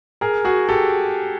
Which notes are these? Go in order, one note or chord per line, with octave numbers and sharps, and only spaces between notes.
G#4 A#4
F#4 G#4
G4 A4